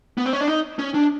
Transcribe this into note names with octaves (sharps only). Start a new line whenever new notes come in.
B3
C4
C#4
D4
D#4
C#4
D4